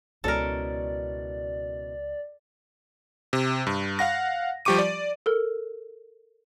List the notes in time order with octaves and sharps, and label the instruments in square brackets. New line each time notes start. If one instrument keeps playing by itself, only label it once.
[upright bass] C#2 [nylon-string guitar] B2 C#4 E4 [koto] A4 A#4 [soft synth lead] D5
[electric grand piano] C3
G2
F5 F#5 A#6
F3 G3 G4 C#6 D6 D#7
D5
[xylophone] A4 A#4